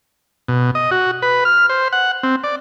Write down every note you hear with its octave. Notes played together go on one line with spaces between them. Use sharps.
B2
D#5
F#4
B4
F6
C5
F#5
C4
D5